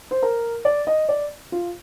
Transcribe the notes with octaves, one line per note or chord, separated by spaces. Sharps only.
C5
A#4
D5
D#5
D5
F4